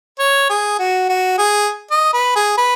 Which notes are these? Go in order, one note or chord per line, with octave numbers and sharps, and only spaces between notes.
C#5
G#4
F#4
F#4
G#4
D#5
B4
G#4
B4